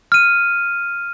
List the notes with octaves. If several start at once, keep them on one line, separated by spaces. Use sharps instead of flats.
F6 D#7